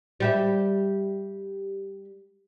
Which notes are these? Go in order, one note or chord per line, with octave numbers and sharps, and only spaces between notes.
G3 G4 E5